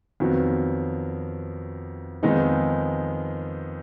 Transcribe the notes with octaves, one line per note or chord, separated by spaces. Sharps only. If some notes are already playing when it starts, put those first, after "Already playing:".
F2 D#3 F#3 B3
F2 D#3 G#3 B3 D#4